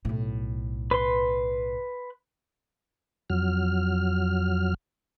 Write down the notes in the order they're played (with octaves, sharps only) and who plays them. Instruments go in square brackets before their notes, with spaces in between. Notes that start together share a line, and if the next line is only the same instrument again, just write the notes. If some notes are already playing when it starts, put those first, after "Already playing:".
[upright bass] B1 A2
[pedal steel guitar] B4 C6
[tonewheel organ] F2 F#3 F6